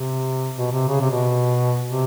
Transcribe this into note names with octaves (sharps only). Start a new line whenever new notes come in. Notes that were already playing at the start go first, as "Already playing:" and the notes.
Already playing: C3
B2
C3
C#3
C3
B2
C3